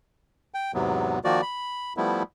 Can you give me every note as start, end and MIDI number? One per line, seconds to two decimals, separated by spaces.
0.54 0.72 79
0.74 1.19 40
0.74 1.19 44
0.74 1.19 48
0.74 1.19 54
0.74 1.19 59
1.24 1.41 51
1.24 1.41 53
1.24 1.41 58
1.24 1.41 66
1.24 1.41 74
1.42 1.93 83
1.97 2.23 53
1.97 2.23 55
1.97 2.23 57
1.97 2.23 59
1.97 2.23 64